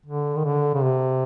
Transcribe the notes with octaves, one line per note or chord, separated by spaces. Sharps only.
D3
D#3
D3
C#3
C3